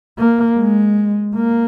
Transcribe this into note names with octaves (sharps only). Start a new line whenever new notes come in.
A#3
G#3
A#3